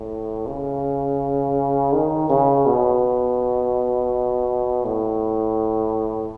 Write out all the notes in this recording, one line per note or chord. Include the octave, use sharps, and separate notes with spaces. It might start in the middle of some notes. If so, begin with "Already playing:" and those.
Already playing: A2
C#3
D#3
C#3
B2
A2